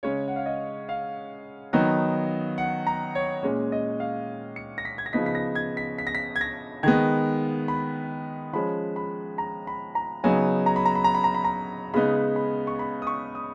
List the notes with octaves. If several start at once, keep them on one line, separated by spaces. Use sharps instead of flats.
C#3 G#3 C#4 C#5
F#5
F5
D#5
F5
D#3 F#3 B3 D#4
F#5
A#5
C#5
A#2 G#3 C#4
D#5
F5
C#7
A#6
B6
G#6
A#6
C#3 F3 B3 D#4 B6
B6
A#6
G#6
B6
B6
A#6
B6
G#6
A#6
D#3 G#3 B3 G#6
B5
F3 G#3 C#4 B5
B5
A#5
B5
A#5
C#3 F#3 B3 D#4 G#5
A#5
B5
A#5
B5
A#5
B5
A#5
B5
A#5
C#3 G#3 B3 D#4 B5
B5
C#6
B5
D#6
C#6
D#6